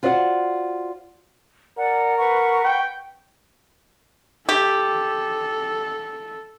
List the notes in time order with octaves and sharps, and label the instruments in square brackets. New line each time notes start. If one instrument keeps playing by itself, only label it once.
[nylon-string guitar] F4 F#4 C5 D5 D#5 F#5
[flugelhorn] A#4 [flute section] D5 F#5
[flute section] B4 F#5 C#6
[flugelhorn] G5
[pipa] G4 [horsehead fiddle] A4